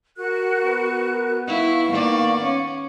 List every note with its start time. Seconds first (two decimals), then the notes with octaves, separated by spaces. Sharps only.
0.17 F#4 A#4 F#6
0.65 B3
1.47 E4 F5 C#6
1.90 D#3 A#3 D5
2.43 C#4